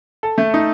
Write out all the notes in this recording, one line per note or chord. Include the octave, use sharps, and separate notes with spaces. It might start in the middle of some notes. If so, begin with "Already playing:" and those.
A4
A3
D#4